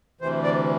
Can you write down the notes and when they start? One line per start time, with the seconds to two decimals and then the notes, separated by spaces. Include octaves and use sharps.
0.21 D2 C3 E3 C5
0.43 D5